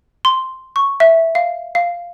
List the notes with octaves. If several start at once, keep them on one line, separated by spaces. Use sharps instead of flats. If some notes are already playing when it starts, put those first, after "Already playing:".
C6
C#6
E5
F5
F5